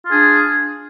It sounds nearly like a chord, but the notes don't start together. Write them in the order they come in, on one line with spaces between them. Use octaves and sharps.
F4 G#4 D4